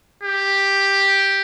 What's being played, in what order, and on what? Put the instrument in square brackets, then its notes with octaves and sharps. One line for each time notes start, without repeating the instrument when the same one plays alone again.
[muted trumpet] G4